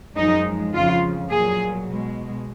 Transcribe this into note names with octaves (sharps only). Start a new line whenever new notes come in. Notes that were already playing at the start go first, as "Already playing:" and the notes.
F#2 F3 G#3 D#4
F2 C#3 F3 F4
A#2 F#3 G#4
B2 G#3